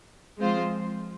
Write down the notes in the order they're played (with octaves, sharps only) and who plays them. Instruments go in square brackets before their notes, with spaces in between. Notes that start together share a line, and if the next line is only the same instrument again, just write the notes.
[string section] F3 G#3 C4 F4 C5